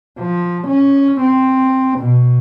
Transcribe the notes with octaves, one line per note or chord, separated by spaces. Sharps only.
F3
C#4
C4
B2